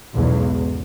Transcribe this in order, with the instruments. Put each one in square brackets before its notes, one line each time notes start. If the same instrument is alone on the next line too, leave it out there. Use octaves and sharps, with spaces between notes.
[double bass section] B1 E2 G#2 C#3 G#3